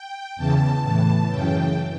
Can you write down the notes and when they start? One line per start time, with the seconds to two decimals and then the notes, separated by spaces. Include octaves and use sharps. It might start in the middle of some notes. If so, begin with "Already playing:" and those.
Already playing: G5
0.36 E2 C#3 E3 A5
0.83 A2 E3
1.30 F#2 C#3 E3 G5